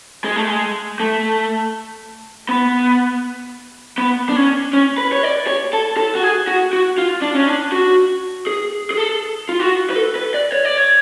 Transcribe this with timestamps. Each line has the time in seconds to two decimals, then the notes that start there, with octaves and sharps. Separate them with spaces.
0.25 G#3
0.36 A3
0.47 G#3
1.00 A3
2.49 B3
3.98 B3
4.29 D4
4.36 C#4
4.73 C#4
4.98 B4
5.13 C#5
5.23 D5
5.47 C#5
5.73 A4
5.97 A4
6.15 F#4
6.22 G#4
6.47 F#4
6.73 F#4
6.98 F4
7.22 D4
7.35 C#4
7.47 D4
7.72 F#4
8.47 G#4
8.91 G#4
8.97 A4
9.49 F4
9.60 F#4
9.90 B4
9.96 A4
10.15 B4
10.34 D5
10.52 C#5
10.65 D5
10.77 C#5